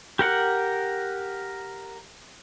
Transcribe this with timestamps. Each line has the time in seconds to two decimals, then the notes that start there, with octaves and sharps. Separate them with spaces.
0.19 G4 A#4 F#5